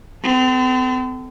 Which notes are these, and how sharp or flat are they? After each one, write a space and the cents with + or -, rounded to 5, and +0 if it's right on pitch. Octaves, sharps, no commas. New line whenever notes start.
C4 -40 A4 +0